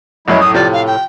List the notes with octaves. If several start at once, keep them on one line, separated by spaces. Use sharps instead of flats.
A#1 F#2 F#3 G#3 C#4 E4
A2 D#6
C3 F3 D5
F5
G5